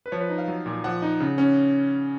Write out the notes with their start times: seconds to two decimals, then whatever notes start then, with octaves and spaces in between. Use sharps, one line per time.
0.06 B4
0.12 F3 C#5
0.20 B4
0.29 D#4
0.38 F5
0.48 F#3
0.66 A#2
0.84 F3 F#5
1.02 D#4
1.20 C#3
1.38 C#4